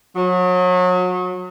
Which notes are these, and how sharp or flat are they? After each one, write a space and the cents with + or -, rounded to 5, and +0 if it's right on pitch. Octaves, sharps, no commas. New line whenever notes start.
F#3 -30